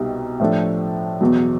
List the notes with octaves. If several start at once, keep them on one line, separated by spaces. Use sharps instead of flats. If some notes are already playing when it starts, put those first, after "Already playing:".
Already playing: C2 B2 G3 D#4
A2 F3 A3 D4
E2 B2 F#3